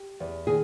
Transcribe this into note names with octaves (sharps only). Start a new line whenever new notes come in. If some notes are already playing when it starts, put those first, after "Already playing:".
Already playing: G4
E2
D#3 G#4